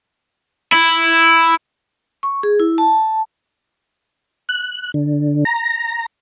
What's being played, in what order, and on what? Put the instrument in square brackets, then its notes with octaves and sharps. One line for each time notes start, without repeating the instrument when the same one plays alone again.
[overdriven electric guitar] E4
[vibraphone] C#6
G#4
E4
A5
[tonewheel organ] F#6
D3
A#5